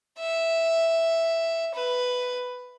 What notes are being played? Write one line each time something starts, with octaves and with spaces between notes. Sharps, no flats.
E5
B4